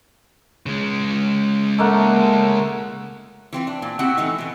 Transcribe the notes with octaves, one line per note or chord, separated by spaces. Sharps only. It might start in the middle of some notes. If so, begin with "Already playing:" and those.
C#3 G#3
A3 A#3 F#5
E3 C4 F4
D4
A#2
C4 E4 F#4 G4 F#5
E3 A3 D#4
B2 E3